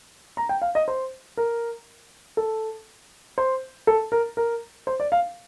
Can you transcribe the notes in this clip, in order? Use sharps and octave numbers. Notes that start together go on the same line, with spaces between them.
A#5
G5
F5
D#5
C5
A#4
A4
C5
A4
A#4
A#4
C5
D5
F5